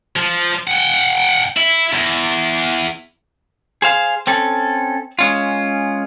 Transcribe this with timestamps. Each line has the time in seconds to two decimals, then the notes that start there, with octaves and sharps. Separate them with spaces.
0.16 F3
0.67 F#5 G5
1.56 E4
1.93 E2
3.82 G#4 C5 F5
4.27 C4 C#4 A4
5.19 G#3 C#4 F4